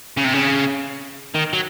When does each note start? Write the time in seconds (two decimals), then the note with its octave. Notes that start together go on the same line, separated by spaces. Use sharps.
0.17 C#3
0.25 C3
0.34 C#3
1.35 D#3
1.53 F#3